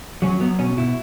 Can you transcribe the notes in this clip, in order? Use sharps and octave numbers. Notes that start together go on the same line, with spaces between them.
F#3 C#4
F#3 B3
B2 C#4
B2 E4